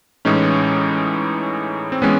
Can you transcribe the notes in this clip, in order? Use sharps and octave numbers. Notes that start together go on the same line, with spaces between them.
A2 E3 G#3 C#4 D#4
C4
E3 G#3 B3 C#4